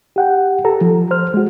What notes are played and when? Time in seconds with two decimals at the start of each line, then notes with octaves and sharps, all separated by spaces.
0.16 G4 F#5 G5
0.64 G4 A4 A#5
0.81 F3
1.11 C5 F6
1.34 G#3 F#4